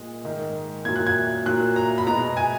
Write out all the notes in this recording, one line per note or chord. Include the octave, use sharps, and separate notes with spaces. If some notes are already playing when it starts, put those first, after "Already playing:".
Already playing: A#2 G#3
G#2 D#3 G#3
A#2 F#3 G#6
F#6
G#6
A#2 F#3 F#6
A#5
B5
B2 G#3 A#5
G#5